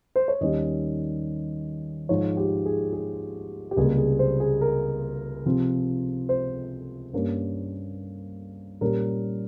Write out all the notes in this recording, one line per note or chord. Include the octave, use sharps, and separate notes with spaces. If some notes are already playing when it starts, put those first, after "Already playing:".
C5
C#5
D#2 D#3 G3 C#4 D#5
G#2 F3 G#3 C#5
G4
G#4
G#4
G4
C#2 C3 G3 A#3 G#4
G#4
C5
G#4
A#4
C3 F3 C4
C5
G2 G3 A#3 C#4
A#2 G3 C#4 A#4